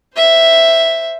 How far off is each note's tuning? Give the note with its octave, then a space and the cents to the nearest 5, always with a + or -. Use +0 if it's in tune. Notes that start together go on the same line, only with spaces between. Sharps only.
C5 +0 E5 +0